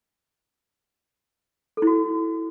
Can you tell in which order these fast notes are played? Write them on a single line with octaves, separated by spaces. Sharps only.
A4 E4 F#4